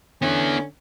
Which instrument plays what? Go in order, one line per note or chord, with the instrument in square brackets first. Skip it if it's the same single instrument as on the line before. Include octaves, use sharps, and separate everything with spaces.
[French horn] D3 [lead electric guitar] B3 E4 [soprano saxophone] C#4